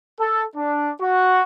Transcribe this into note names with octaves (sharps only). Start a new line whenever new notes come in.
A4
D4
F#4